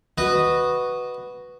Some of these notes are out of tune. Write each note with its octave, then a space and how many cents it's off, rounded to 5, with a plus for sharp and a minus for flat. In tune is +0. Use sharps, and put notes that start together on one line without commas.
F#4 +0 B4 +0 D#5 -10